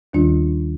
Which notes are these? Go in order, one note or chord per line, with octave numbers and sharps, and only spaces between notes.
D#2 D#3 G3 D4 F4